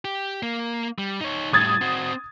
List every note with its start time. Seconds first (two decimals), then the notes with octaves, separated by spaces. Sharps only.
0.05 G4
0.43 A#3
0.99 G3
1.21 D#4 C#5
1.53 A2 G3 D#6 G#6 A6
1.81 C4 F#4